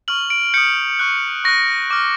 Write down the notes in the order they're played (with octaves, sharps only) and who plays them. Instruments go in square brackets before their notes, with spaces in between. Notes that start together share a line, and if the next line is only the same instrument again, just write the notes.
[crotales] C#6 F6 F#7
D7
D#6 G6 C#7
C#6 F#6
C#6 F#6 A#6
D6 F6